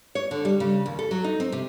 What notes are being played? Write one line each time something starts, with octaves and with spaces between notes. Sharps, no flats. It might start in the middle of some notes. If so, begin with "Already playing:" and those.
C#5
D3
G3
C#3
D#2
A4
F#3
D#4
C4
C3